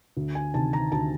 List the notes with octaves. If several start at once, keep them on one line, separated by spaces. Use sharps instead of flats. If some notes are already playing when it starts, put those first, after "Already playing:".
D2
G#5
C3 D#3 A5
A#5
D2 A5